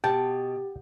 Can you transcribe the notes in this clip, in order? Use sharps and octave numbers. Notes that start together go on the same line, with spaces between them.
B2 G4 G5 A5